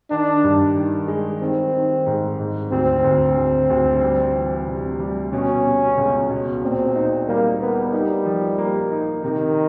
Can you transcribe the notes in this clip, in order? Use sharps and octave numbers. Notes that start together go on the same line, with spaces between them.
D#3 D4
G2
D#3
G#3
D#3 C4
D#3
G#2
G#2
D2 C4
D2
D2
D2
G3
E3
C3
G3
B2 C#4
B2
C#2
B2
A#2 C4
D#4
G3 A#3
A#3 B3
G3 D#4
F3
A#3
D#4
C3 D#3